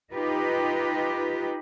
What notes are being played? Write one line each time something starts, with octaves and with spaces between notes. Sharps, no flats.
D#4 F4 G4 B4